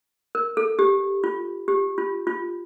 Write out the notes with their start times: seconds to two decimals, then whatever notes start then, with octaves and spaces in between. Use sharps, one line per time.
0.35 A#4
0.57 A4
0.79 G4
1.24 F4
1.68 G4
1.98 F4
2.27 F4